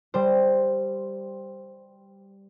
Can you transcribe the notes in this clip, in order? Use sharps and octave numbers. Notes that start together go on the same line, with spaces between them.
G3 C5